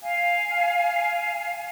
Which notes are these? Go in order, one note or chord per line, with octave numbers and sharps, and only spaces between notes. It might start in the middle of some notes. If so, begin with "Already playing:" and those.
F5 G#5